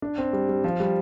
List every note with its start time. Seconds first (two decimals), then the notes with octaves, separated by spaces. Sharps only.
0.02 D4
0.18 C4
0.33 G3
0.49 G3
0.64 F3
0.80 G3